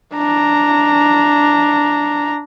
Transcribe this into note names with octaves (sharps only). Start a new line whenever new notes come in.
D4 A#5